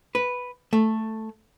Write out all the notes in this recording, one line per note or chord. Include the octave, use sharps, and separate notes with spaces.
B4
A3